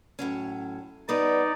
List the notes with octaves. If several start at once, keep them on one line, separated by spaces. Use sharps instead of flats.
A2 F#3 C#4
G3 B3 D#4 B4 D5